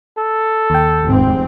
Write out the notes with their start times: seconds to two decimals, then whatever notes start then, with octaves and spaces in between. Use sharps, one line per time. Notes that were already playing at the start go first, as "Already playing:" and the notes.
0.18 A4
0.70 D#2 G5
1.05 F1 G#2 C4